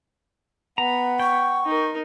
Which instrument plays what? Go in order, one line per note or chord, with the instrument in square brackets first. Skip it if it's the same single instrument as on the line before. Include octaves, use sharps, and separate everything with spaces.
[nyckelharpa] B3 B5 [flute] F#5 [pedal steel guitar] A#5
[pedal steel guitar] G5 [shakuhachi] C#6
[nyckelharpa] D#4 A#4